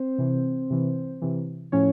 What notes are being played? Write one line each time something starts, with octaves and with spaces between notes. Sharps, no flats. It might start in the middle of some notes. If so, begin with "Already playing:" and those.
Already playing: C4 C5
C3 E3
C3 E3
C3 E3
A2 F3 C#4 C#5